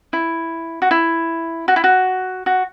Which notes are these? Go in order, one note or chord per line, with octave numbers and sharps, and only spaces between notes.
E4
F#4
E4
F#4
E4
F#4
F#4